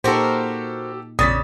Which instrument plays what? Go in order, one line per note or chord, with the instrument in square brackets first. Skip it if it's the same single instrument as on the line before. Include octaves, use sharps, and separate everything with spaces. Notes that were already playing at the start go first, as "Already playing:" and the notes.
[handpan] A#2 D#4 [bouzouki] F#4 A#4 C5 [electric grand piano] G4 A4
[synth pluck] A#1 F2 [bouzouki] C#3 [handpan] D5 [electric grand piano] D#6 A6 B6